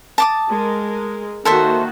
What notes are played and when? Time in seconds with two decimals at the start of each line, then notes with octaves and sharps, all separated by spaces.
0.18 A5 D6 D#6
0.50 G#3 A#4
1.45 D#3 A#3 F#4 A4 C5 E5